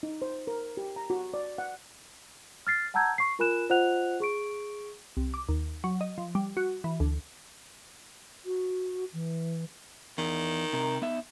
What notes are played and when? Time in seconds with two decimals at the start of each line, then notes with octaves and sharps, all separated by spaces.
0.03 D#4
0.22 C5
0.47 A#4
0.77 G4
0.96 A#5
1.10 F#4
1.34 D5
1.58 F#5
2.67 F6 A6 C7
2.94 F#5 A5 A#5 E6 G6 G#6
3.18 C#6 C7
3.39 F4 A#4 G#5 B5 F#6 E7
3.69 F4 C5 D#5 F#5 F#6 F7
4.20 G#4 C#6 D7
5.17 C2
5.34 D6
5.49 D#2
5.84 F#3
6.01 D#5
6.18 F3
6.35 G3
6.57 F#4
6.84 E3
7.00 D2
8.46 F#4
9.13 E3
10.18 E2 D#3
10.73 C3 A#4
11.02 B3 D#4 E5